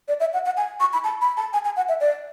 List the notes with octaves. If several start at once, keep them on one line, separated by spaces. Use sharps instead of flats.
D5
E5
F#5
F#5
G#5
C#6
B5
A5
B5
A5
G#5
G#5
F#5
E5
D5